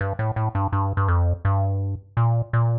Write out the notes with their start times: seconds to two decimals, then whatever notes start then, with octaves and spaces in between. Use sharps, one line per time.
0.01 G2
0.19 A2
0.36 A2
0.55 G2
0.72 G2
0.97 G2
1.08 F2
1.45 G2
2.17 A#2
2.53 A#2